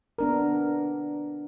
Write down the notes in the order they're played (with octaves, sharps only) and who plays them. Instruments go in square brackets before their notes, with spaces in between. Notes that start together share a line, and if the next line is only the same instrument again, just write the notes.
[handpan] B3 D4 A#4